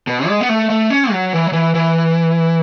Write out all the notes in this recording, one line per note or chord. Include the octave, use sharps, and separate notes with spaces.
B2
G#3
B3
A3
A3
C#4
F#3
E3
F#3
E3
E3